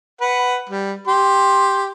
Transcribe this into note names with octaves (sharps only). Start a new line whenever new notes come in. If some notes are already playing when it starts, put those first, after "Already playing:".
B4 F#5
G3
G4 C6